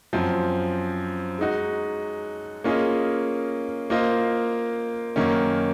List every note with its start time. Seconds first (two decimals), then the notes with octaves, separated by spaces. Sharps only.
0.13 F#2 F3 C4
1.39 G#3 D#4 F#4
2.64 A#3 C#4 F4 G#4 D#5
3.90 A#3 F4 C5 D#5
5.16 F#2 D#3 A#3 C#4